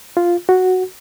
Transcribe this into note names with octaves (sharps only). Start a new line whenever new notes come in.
F4
F#4